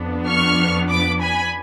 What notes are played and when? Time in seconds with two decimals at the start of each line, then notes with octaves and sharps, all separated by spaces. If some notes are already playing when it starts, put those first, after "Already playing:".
Already playing: F2 F3 B3 D4
0.26 C#6 F6
0.89 B5 D6
1.21 G#5 B5